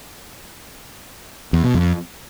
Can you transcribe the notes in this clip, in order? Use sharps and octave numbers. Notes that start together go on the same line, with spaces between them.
E2
B2
F2